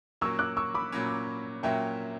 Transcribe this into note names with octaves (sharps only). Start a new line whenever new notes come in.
A#2 F#3 A#3 C#4 C#6 E6
D6 F#6
C#6 E6
B5 D6
A#2 F#3 A#3 C#4
A#2 F#3 A#3 C#4 E5 G5